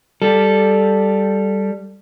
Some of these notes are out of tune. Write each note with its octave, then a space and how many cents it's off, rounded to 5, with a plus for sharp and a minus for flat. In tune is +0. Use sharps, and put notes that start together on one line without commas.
G3 +0 A4 -5